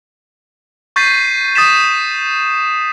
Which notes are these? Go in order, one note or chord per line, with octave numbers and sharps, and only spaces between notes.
C#6 G6 A6 B6 C7 D#7
D#6 A6 B6 E7